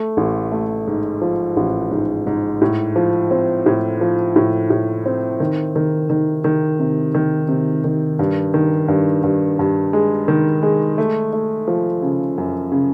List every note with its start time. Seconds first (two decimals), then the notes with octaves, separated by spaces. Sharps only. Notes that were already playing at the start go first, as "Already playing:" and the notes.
Already playing: A3
0.17 A1
0.52 A3
0.87 G#2
1.21 F3
1.57 A1
1.91 G#2
2.27 G#2
2.61 A2
2.96 F3
3.31 C4
3.66 A2
4.01 F3
4.36 A2
4.70 A2
5.06 C4
5.40 D#3
5.76 D#3
6.10 D#3
6.44 D#3
6.79 C3
7.15 D#3
7.49 C3
7.84 D#3
8.19 G2
8.54 D#3
8.88 G2
9.23 G2
9.59 G2
9.93 G#3
10.28 D#3
10.63 G#3
10.98 A3
11.33 A3
11.68 F3
12.02 C#3
12.38 F#2
12.72 C#3